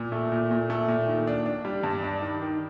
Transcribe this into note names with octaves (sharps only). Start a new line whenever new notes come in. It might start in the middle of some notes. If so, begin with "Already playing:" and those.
Already playing: A#2
A3
A#2
A#2
A3
A#2
D#3
D4
D4
G3
G2
D4
D#3
D#3